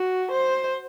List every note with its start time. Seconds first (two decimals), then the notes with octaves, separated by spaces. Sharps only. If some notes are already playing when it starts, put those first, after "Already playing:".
Already playing: F#4
0.31 C5